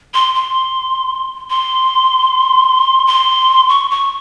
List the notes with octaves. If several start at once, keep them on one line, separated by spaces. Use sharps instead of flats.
C6
C6
C6
C6
C#6
C#6